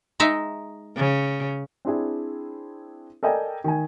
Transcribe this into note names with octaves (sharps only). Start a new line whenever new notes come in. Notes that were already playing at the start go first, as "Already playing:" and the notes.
G#3 D#4 E5
C#3
C4 D4 E4 G#4
A4 A#4 D5 D#5 G5 G#5
D#3 G#5